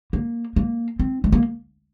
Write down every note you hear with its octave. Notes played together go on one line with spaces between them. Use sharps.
A#3
A#3
C4
A3
A#3